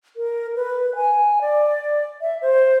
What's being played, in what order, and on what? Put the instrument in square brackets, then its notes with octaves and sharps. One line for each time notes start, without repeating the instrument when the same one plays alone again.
[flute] A#4
B4
G#5
D5
E5
C5